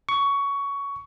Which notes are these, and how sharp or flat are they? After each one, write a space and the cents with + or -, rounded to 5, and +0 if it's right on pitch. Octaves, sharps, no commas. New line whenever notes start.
C#6 +15